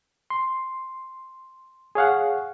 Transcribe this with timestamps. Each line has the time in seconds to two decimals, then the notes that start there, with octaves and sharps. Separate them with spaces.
0.30 C6
1.95 G#4 C#5 F5 F#5